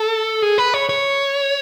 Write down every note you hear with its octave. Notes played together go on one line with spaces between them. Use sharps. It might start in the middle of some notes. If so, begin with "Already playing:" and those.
Already playing: A4
G#4
B4
C#5
C#5